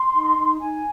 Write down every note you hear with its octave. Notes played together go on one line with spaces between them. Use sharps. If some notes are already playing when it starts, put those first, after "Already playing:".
Already playing: C6
D#4
D#4
D#4 G#5